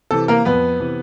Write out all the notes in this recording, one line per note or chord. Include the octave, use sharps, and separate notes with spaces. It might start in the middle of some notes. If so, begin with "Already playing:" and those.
C3 E3 A4
A#3 A#4
F2 B3 B4
C3 E3